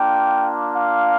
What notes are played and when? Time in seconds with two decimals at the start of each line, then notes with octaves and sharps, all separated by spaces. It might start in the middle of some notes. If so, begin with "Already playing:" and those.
Already playing: A#3 D4 F4 G5
0.75 F5